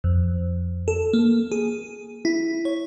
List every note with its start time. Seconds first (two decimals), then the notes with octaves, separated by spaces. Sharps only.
0.04 F2
0.88 A4
1.13 A#3
1.52 G#4
2.25 E4
2.65 C#5